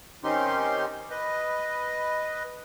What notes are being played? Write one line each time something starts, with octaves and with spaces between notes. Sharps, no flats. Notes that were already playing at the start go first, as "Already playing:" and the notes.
D#3 C4 C#4 D#4 G4 C6
B4 D#5